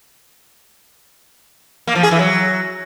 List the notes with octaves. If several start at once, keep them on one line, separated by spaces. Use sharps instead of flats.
A#3
F3
G#4
E3
F#3